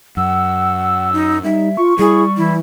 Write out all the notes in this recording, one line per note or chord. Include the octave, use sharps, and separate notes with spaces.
F#2 F#5 E6
D#4
G3 D#4 E5
F4 C#6
G3 E4 G#4
E3 E4